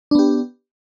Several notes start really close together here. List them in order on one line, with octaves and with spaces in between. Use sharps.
D4 B3 G4